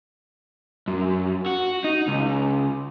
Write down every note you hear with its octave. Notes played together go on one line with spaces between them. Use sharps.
F#2
F#4
D#4
C#2